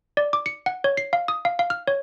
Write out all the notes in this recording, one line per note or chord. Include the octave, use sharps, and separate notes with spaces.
D5
D6
C#7
F#5
C#5
C7
F5
D#6
F5
F5
F6
C#5